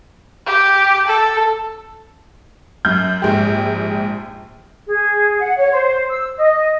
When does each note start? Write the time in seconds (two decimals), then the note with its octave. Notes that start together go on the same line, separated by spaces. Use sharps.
0.46 G4
1.07 A4
2.85 F#2 G6
3.22 A#1 G#2 G4
4.88 G#4
5.38 F#5
5.57 C#5
5.72 C5
6.09 E6
6.37 D#5